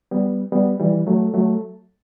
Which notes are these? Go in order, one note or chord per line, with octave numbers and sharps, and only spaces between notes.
G3 B3
G3 B3
E3 G3
F#3 A3
F#3 A3